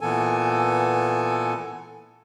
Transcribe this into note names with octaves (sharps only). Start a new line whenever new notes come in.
A#2 E3 B3 A4 G#5